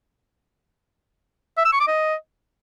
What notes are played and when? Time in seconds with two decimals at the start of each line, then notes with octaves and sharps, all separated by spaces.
1.58 E5
1.65 E6
1.73 C#6
1.80 D6
1.87 D#5